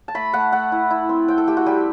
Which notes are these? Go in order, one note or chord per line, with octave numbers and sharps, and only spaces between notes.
A5
A3 B5
A3 F#5
A3 F#5
E4
E4
C4
C4 G5
A4
A3 G4
F#4
G3 G4